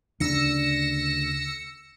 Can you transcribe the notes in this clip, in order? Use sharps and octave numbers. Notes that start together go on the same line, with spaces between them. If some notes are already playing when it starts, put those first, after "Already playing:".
D2 C#3 D4 E6 A#6 C#7